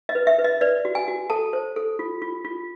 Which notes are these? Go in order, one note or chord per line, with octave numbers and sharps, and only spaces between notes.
D#5
B4
E5
B4
D#5
B4 D5
F#4
G#5
F#4
A4 A5
C5
A4
F4
F4
F4